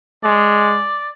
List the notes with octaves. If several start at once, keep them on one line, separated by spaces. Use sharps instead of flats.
G#3 D5